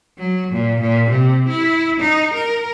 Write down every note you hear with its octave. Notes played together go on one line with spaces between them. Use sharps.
F#3
A#2
A#2
C3
E4
D#4
A#4